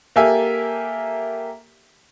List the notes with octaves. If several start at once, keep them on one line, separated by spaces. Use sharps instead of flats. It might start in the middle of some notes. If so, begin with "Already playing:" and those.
A#3 G4 A4 A#4 E5 G#5